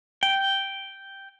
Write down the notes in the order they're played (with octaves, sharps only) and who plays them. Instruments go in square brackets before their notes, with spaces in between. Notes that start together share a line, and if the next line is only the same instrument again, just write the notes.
[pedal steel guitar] G5